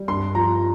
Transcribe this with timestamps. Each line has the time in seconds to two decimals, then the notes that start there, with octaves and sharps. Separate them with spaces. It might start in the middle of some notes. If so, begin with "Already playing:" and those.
Already playing: G3
0.08 G2 C6
0.35 F3 A#5